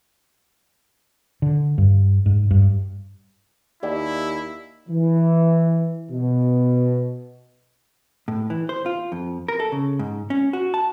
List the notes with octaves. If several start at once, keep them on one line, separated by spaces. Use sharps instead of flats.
D3
G2
G#2
G2
D#2 E4 G4 D5 G5
E3
B2
A2
E3
C5
F4
F2
A#4
A4
C#3
G#2
C#4
F#4
A5